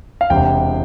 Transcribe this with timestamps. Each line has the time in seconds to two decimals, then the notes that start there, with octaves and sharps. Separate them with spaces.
0.21 F5
0.30 E1 E2 C3 G5